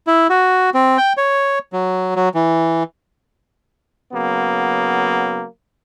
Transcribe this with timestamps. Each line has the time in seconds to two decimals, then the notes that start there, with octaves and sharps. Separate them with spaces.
0.07 E4
0.30 F#4
0.74 C4
0.98 G5
1.17 C#5
1.73 F#3
2.16 F#3
2.34 E3
4.12 C#3 F#3 A#3 B3